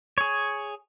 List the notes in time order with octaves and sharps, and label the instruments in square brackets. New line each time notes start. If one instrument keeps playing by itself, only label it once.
[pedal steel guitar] G#4 C#5